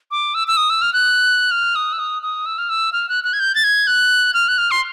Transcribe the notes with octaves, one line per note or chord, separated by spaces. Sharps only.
D6
E6
E6
D#6
E6
F6
F#6
F6
D#6
E6
D#6
D#6
E6
F6
E6
F6
F#6
F#6
G#6
G6
A6
G#6
F#6
F6
F#6
F6
C6